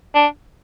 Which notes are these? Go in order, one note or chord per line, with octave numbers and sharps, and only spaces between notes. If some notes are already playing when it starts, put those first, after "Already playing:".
D4